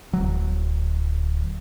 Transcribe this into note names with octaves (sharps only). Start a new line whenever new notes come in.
D1 F#3